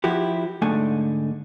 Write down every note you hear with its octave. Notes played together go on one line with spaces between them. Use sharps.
F3 E4 F#4 G4
G#2 D3 A3 G#5